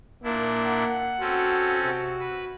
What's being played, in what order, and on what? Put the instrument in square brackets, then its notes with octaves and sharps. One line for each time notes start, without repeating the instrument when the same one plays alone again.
[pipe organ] A#2 D4 E4 [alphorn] A#3
[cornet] F#5
[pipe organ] C4 C#4 A4 [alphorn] F#4
[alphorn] C3 [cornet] F#4
[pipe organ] B4